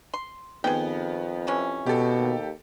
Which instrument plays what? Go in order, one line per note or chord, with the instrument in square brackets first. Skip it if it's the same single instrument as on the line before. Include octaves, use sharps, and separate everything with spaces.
[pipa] C6
[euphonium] F2 [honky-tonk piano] D#3 B3 [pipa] G#4 G5
[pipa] C3 E3 C#4
[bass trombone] B2 [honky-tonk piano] G4 A4
[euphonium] D#2